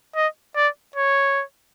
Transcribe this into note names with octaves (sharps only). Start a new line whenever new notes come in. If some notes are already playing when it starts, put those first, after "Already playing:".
D#5
D5
C#5